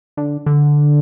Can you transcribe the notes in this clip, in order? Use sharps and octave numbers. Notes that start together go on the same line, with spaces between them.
D3
D3